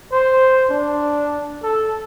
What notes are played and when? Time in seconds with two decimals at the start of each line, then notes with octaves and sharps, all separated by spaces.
0.12 C5
0.71 D4
1.63 A4